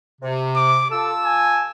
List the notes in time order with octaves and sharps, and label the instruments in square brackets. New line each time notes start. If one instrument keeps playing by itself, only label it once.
[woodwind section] C3
[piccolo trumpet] D6
[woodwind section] F4 A5 E6 [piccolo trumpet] A4
[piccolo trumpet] G#5